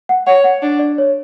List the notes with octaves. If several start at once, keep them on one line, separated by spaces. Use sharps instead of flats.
F#5
C#5 F#5
F#5
D4
D5
C#5